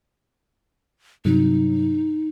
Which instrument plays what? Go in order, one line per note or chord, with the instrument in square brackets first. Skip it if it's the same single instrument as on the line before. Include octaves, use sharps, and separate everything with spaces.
[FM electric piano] G2 C3 F#3 [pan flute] D#4